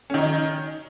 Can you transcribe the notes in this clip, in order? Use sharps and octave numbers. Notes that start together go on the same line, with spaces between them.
D#3 C#4 D#4